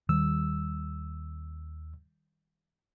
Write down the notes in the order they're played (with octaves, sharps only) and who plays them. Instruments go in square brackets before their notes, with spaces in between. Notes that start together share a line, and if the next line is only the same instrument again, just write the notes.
[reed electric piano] D#2 E6 [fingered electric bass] D#3 G3